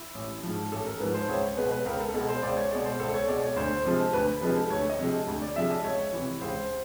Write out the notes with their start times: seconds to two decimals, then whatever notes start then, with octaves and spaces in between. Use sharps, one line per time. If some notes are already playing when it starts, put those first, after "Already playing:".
Already playing: E4
0.14 A1
0.43 G#2 F3
0.72 A1 A4
0.86 A#4
1.00 G#2 F3 B4
1.14 C5
1.29 C#2 C#5
1.57 B2 G#3 B4
1.71 B4
1.85 C#2 A#4
2.00 A4
2.13 B2 G#3 A#4
2.29 C5
2.42 C#2 D5
2.57 C#5
2.71 B2 G#3 D5
2.85 C5
2.99 C#2 A4
3.14 C#5
3.28 B2 G#3 D5
3.43 C#5
3.56 D2 C5
3.85 C3 F3 G#3
4.13 D2 B4
4.41 C3 F3 G#3 B4
4.56 A4
4.70 D2 C#5
4.89 D#5
4.99 C3 F3 G#3
5.27 D2
5.42 D5
5.56 C3 F3 G#3 E5
5.70 D#5
5.84 C#2 C#5
6.13 C3 E3
6.41 C#2 C5